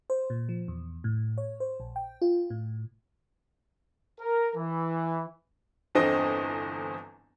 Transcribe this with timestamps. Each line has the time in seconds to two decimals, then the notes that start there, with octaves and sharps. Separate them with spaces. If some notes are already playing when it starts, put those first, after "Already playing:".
0.10 C5
0.30 A#2
0.49 F3
0.68 E2
1.04 A2
1.38 C#5
1.60 C5
1.80 A#1
1.96 G5
2.22 F4
2.50 A2
4.21 A#4
4.56 E3
5.95 G1 E2 D3 C4 D#5 D#6